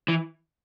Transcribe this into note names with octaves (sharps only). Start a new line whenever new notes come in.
E3